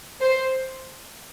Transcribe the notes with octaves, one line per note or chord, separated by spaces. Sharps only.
C5